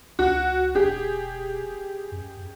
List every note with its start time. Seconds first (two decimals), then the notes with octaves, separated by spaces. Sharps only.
0.19 C#2 F#4
0.75 E1 G4 G#4
2.12 F#2